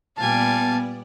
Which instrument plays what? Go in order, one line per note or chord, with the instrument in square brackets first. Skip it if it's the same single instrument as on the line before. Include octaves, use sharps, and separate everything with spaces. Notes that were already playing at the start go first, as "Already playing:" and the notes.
[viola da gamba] A#2 G3 [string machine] B3 D5 [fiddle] F5 G#5 [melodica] A5